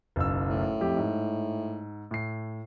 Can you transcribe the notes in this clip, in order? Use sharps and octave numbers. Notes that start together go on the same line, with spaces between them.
F#1 B1 E6
A2
F2 G4
G#2
A2 C7